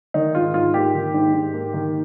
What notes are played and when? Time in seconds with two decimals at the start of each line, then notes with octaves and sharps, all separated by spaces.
0.14 D#3 D#4
0.35 G#2 F4
0.54 G#2 F4
0.74 A#3 G4
0.94 D#3
1.14 G#2
1.33 G#2
1.54 A#3
1.74 D#3